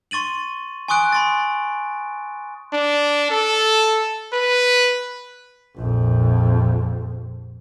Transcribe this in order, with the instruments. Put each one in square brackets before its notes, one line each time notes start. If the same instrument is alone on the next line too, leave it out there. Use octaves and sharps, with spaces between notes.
[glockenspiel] C6 C#6 A6 D#7 F#7
G#5 C6 C#6 D#6 F#6 D7
B5 C6 A6
[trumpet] D4
A4
B4
[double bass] A#1 F2